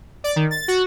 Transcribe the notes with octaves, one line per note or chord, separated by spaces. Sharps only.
D5
D#3
A6
F#4